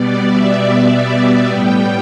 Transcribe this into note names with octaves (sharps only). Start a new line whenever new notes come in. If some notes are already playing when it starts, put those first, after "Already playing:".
Already playing: B2 G3 B3 D5
E5
E5
A2 G3 B3 G5